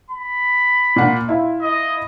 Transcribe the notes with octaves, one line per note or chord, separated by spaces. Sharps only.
B5
A#2 F#5
E4 F4
D#5